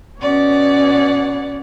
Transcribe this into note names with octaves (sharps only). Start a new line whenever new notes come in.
B2 C#4 C#5 D5 F#5